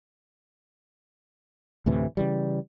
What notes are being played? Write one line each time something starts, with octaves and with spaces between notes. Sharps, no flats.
D2 A2 C3 E3
C#3 E3 G3